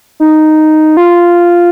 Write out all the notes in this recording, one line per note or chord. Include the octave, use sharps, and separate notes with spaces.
D#4
F4